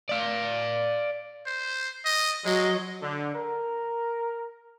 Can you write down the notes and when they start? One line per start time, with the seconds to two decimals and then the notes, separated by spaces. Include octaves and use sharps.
0.09 D5 F5
1.46 C5
2.05 D#5
2.45 F#3 G#3 D#5
3.02 D3
3.35 A#4